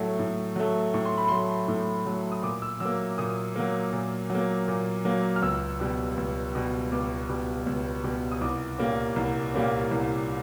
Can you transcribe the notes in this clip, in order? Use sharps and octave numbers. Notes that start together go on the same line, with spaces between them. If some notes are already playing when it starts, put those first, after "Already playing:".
Already playing: A2 F#3 A3
A2
F#3 A3
A2 C#6
C6
B5
F#3 A3 C6
A2
F#3 A3
D#6
A#2 D6
E6
F#3 A#3 E6
A#2 D#6
F#3 A#3
A#2
F#3 A#3
A#2
F#3 A#3
F6
C#2 E6
B2 G3
C#2
B2 G3
C#2 D6
B2 G3
C#2
B2 G3
D#6
C2 D6
A#2 G3 A#3 C#4
C2
A#2 G3 A#3 C#4
C2